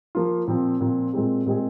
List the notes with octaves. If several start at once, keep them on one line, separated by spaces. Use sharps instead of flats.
F3 A#3 F4
A#2 F3 C4
A#2 F3 C4
A#2 G#3 C4 G#4
A#2 G#3 C4 G#4